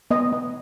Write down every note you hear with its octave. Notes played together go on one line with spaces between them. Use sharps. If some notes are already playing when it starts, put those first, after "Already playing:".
B3 D#5
B3